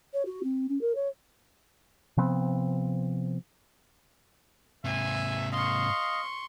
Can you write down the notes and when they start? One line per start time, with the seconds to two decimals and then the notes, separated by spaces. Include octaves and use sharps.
0.14 C#5
0.26 F#4
0.43 C4
0.69 C#4
0.81 A#4
0.95 C#5
2.17 C3 F3 B3 C4
4.85 G#2 C3 E5 G#5
5.52 D#5 F5 C6 C#6